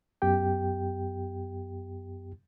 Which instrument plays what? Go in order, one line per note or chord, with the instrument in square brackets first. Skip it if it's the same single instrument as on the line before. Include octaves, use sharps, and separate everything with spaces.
[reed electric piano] F#2 B3 G4 G5